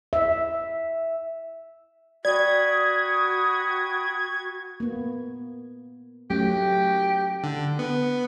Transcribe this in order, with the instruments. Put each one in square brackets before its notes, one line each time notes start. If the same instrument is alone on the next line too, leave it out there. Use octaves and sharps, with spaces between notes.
[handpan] E5
[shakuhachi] F#4 [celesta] D5 [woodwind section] G5 B5 D#6 [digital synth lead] G#6
[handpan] A#3 B3
[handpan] F#3 A3 C#4 [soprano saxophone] G4
[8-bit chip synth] D3
B3